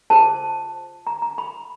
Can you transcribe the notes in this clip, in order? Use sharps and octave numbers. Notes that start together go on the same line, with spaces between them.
F4 G#4 C5 A5
A#5
A#5
B5